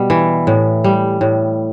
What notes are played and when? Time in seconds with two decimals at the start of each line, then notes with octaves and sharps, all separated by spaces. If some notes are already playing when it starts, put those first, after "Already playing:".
Already playing: B2 G3
0.10 E3
0.47 A2
0.84 G3
1.21 A2